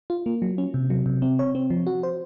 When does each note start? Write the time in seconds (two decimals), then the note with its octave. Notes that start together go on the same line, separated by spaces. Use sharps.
0.10 F4
0.26 A#3
0.42 F#3
0.58 C#4
0.74 C3
0.90 F#3
1.06 C3
1.22 C4
1.39 C#5
1.55 C4
1.70 F3
1.87 F#4
2.03 C5